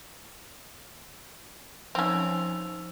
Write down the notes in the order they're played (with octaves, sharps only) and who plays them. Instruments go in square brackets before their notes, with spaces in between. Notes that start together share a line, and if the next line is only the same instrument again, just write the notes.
[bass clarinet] F3 [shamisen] C4 C#4 [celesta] D#4 E6 F7